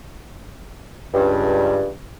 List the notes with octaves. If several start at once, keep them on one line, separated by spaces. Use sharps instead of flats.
C#2 G2